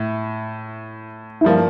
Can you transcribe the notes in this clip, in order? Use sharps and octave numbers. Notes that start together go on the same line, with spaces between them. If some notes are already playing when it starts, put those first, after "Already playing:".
Already playing: A2 E4
E4
G2 F3 A#3 F4